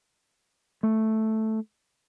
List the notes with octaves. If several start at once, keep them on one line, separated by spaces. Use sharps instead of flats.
A3